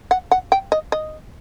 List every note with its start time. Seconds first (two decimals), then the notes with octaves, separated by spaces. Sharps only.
0.11 F#5
0.31 F#5
0.52 G5
0.72 D#5
0.92 D#5